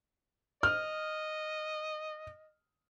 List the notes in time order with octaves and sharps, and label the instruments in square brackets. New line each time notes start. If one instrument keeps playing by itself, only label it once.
[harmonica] D#5 [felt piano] F6